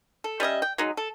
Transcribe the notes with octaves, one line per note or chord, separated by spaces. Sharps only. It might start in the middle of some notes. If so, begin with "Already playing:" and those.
A4
G3 C#4 D#5 E5
G5
F#3 G#3 D#4
A4